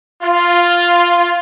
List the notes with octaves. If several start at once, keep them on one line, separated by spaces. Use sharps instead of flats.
F4